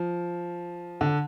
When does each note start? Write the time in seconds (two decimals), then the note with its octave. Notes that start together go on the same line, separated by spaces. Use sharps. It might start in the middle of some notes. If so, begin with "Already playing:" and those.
Already playing: F3
1.01 D3